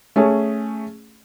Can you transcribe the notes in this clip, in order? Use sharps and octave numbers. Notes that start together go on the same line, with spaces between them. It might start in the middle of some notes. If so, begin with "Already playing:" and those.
A3 C#4 G#4